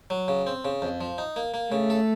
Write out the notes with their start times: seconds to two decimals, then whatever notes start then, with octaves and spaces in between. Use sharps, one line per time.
0.10 F#3
0.28 C#3
0.47 C4
0.65 C#3
0.82 F2
1.01 F3
1.18 D#4
1.36 A#3
1.54 A#3
1.72 C#3 A3
1.90 A4